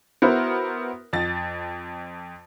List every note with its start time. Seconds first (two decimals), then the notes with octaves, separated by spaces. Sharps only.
0.22 B3 E4 F#4 A#4 C5
1.13 F2 A6